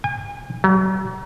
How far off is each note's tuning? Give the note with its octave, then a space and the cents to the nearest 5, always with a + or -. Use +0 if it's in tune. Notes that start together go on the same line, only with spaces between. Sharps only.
G#5 -40
F#3 +40